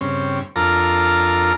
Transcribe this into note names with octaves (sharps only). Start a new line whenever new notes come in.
G2 C#3 C4 C#4
F2 D4 F4 A4 A#4 A#5